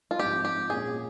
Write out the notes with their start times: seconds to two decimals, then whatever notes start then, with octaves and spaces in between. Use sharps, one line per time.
0.11 F4
0.19 G#2 F3 C4 G4
0.45 G4
0.70 A#2 G#3 C#4 F4 G#4